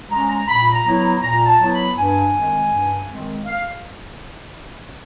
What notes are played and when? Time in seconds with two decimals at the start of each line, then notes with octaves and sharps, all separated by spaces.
0.09 G#3 C#4 A#5
0.28 A#5
0.46 A#2 B5
0.71 A#5
0.84 F#3 B3 E4
0.97 A#5
1.21 A#2 A#5
1.46 A5
1.58 F#3 B3 E4
1.71 B5
1.95 G2 G#5
2.33 D#3 G#3 C4
2.69 G2
3.06 D#3 G#3 C4
3.44 F5